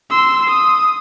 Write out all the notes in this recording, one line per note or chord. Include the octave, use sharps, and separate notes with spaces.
C6 E6
D#6